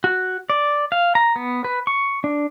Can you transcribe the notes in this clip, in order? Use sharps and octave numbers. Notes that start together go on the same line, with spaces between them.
F#4
D5
F5
A#5
B3
B4
C#6
D4